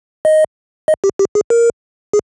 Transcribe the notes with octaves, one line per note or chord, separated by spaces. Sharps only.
D#5
D#5
G4
G4
G#4
A#4
G#4